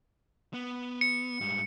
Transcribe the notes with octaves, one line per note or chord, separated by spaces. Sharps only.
B3
C#7
G#2 G3